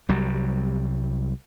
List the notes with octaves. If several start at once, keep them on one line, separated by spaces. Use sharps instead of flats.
C2 F#3 G3